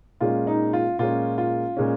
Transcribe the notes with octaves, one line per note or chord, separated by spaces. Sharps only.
A#2 G#3 C#4 F4
D#4
F4
A#2 G#3 C#4 F4
F4
A#2 G#3 C#4